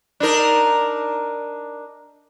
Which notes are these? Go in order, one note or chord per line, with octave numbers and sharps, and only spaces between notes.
D4 D#4 A#4